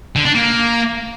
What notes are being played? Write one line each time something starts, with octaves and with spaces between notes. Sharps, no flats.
D3
D4
A#3